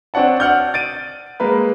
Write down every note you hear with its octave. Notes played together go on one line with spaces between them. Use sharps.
C4 D4 C#5 F#5 A5
D5 F#5 F6 G6
A6 D7 D#7
G#3 A#3 A#4 B4